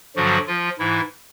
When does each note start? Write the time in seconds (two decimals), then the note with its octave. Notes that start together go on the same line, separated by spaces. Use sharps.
0.16 G2 D3 F3 F#3 F#4
0.47 F3 F4
0.79 G#2 E3 E4